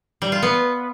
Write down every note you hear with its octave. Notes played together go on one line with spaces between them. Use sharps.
G3
F4
B3